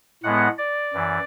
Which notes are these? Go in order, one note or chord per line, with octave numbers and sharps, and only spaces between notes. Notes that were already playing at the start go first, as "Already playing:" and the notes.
A2 G#3 B3 F#5
D5
F#2 E3